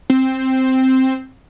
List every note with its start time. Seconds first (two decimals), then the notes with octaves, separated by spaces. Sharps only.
0.10 C4